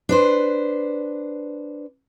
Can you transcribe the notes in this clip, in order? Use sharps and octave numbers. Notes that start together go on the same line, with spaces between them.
D4 B4 C5